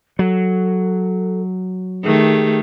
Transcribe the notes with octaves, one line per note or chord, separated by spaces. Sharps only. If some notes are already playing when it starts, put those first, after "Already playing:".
F#3 A4
D#3 A3 G4 G#4